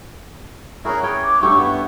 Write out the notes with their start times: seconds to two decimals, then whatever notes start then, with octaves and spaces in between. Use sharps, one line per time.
0.85 C#4 E4 F#4 G#4 A#4
1.03 G#4 B4 C#5 G5
1.22 D6
1.42 G2 A3 G4 C#5 F5 C#6
1.57 B3 E4 F#5